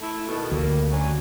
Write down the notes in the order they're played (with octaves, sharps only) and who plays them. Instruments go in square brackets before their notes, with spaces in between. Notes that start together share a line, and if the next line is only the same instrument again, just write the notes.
[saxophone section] A3 E4
B2 D#3 A4
[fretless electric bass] D2 [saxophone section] G3 A#3
[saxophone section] F#3 C#4 D4